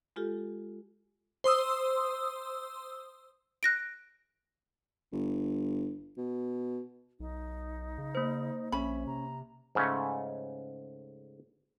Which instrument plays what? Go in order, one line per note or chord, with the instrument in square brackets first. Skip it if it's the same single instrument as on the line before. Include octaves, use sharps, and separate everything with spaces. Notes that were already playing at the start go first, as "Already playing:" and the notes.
[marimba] G#3 F4 G4 A4
[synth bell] C5 C6 D#6 E6
[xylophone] F#6 A#6 D7
[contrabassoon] G1
B2
[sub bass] B1 [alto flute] D#4
[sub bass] C#3
[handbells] A#3 C5
[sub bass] A#1 [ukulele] C#4 B5 [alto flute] E5
[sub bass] C3 [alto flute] A#5
[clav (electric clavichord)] G#2 C#3 A3 C#4